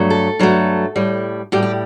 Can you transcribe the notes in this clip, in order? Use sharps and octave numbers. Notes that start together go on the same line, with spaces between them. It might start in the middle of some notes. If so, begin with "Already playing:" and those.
Already playing: G2 F#3 A3
A4
G2 F#3 A3
A2 G3
A2 G3 G4
G4